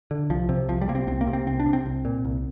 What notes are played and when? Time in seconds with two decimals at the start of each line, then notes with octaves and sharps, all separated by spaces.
0.11 D3
0.30 C2 F3
0.49 C3
0.68 C2 F3
0.81 G3
0.89 C3 A#3
0.95 C4
1.07 C2 C4
1.21 A#3
1.27 C3
1.33 C4
1.47 C2 C4
1.60 D4
1.66 C3
1.73 C4
1.86 C2
2.05 A#2
2.24 C2